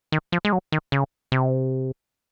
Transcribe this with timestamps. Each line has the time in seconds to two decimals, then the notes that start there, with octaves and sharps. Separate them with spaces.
0.12 D#3
0.32 F3
0.45 G#3
0.53 F#3
0.72 D#3
0.92 C#3
1.32 C3